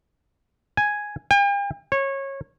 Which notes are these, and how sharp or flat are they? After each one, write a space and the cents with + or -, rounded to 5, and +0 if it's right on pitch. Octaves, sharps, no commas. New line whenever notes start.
G#5 +0
G5 +45
C#5 -20